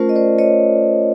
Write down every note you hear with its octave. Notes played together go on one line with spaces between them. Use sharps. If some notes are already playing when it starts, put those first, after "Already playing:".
Already playing: A3 C#4 F4 A#4 C5
D#5
C5 D5
C#5 D#5